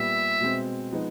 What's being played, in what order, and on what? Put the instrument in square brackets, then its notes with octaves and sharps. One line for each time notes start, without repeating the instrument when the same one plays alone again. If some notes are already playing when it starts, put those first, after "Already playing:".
Already playing: [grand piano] A#2 G3 B3 [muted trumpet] E5
[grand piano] B2 G#3 C4
F3 G#3 B3 D#4